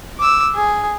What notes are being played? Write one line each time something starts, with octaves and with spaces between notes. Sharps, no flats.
D6 E6
G#4